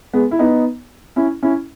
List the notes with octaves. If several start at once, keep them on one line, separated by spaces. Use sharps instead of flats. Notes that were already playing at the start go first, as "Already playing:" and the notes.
G#3 B3
E4
B3 D#4
C#4 E4
C#4 E4